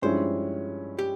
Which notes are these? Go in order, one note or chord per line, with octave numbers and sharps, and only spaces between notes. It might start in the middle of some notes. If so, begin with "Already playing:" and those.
G2 F3 G#3 C#4 E4 C5
G4